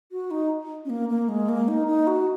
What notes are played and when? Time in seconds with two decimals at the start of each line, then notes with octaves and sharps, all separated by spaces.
0.12 F#4
0.31 D#4
0.85 C#4
0.90 A#3
1.09 A#3
1.29 G#3
1.49 A#3
1.68 D#4
1.87 D#4
2.07 F#4